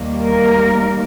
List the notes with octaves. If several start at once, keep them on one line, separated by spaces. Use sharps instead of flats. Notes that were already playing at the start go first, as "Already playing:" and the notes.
Already playing: D#2 D#3 G3 A#3
A#4